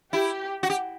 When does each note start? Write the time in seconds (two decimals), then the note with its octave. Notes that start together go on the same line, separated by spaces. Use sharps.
0.13 E4 G4
0.63 F#4
0.70 G4